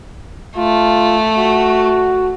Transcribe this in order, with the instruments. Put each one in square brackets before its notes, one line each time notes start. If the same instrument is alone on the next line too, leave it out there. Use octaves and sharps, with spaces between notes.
[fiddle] A3 [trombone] F4
[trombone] F#4